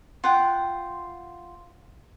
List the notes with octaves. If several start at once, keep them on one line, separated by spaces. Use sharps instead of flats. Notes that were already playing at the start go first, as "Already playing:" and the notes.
F4 F#5 G5